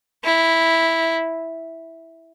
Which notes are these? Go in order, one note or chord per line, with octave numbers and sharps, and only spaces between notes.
E4